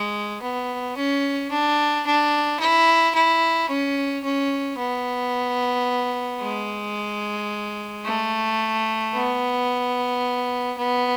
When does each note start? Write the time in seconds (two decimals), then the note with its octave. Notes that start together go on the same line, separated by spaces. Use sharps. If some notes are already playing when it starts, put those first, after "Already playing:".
Already playing: G#3
0.42 B3
0.97 C#4
1.51 D4
2.06 D4
2.60 E4
3.15 E4
3.69 C#4
4.24 C#4
4.78 B3
6.42 G#3
8.05 A3
9.15 B3
10.78 B3